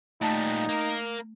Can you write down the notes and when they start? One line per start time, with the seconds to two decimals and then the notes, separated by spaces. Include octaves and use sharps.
0.21 A#2 G3 A3 D#4 A5
0.69 A#3 A#4